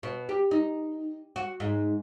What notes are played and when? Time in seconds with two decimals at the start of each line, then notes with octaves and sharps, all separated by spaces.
0.03 B2
0.29 G4
0.51 D#4
1.36 F#4
1.60 G#2